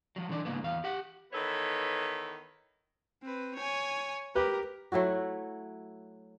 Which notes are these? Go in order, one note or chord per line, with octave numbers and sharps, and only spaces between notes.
F3 F#3
D3 E3 D4 D5
G#2 C#3 A#3 B3
E2 F5
G4 F#5
D#3 E3 B3 A4 C#5
C4 B4
C#5 G#5
G4 A#4 B4
F#3 A3 E4 F#4